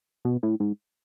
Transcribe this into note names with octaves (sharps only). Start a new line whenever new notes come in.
B2
A2
G#2